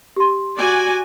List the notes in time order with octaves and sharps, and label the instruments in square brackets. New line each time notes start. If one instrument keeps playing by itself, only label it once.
[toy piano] G4 C6
[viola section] F#4 D5 G#5